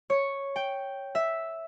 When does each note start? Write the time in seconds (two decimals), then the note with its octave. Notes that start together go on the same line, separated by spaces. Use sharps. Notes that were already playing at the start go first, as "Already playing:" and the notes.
0.10 C#5
0.56 G5
1.15 E5